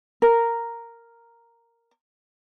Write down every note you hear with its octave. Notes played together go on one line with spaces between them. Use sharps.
A#4